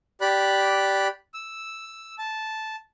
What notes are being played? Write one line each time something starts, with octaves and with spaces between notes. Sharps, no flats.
G4 D5 B5 F#6
E6
A5